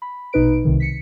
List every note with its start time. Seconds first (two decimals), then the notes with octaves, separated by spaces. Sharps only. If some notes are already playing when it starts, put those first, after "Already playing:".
0.02 B5
0.33 A#1 B2 D#4 B4 D7
0.65 C2 C3 D#3
0.80 B6 C#7